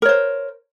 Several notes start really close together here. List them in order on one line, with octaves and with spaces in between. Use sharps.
A#4 C#5 C5